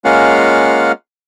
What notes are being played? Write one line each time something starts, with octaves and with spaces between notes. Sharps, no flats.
G#3 A#3 C#4 F4 F5 F#5